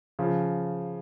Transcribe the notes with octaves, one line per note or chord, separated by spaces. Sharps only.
C#3 F3